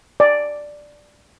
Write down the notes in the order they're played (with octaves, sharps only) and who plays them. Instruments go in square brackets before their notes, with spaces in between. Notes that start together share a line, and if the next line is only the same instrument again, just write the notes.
[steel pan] D5